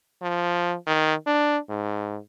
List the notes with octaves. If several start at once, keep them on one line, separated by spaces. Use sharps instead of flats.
F3
D#3
D4
G#2